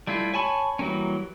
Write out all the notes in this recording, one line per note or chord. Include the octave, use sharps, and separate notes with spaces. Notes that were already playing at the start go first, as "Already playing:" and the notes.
G3 A3 E4 F4
C#5 G#5 A5 B5 C#6
E3 F#3 G3 A#3 C#4